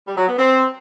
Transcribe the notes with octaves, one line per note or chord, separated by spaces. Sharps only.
G3
F#3
B3
C4